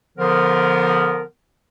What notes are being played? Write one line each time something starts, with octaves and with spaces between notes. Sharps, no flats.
D3 F3 B3 A#4